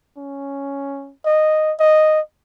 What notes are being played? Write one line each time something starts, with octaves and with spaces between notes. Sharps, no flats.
C#4
D#5
D#5